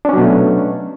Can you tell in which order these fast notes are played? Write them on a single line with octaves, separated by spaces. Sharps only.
D4 C#4 F#3 B2 A3